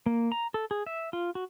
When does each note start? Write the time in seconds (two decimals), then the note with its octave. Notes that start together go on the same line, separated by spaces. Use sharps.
0.06 A#3
0.32 A#5
0.54 A4
0.71 G#4
0.86 E5
1.13 F4
1.35 F#4